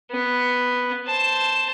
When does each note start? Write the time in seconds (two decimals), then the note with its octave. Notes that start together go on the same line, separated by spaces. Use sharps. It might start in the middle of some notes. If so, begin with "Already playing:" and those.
0.11 B3
1.07 C5 A5